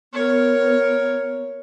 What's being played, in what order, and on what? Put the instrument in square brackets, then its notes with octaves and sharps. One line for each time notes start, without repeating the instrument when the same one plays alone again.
[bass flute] B3 [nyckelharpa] A#4 C#5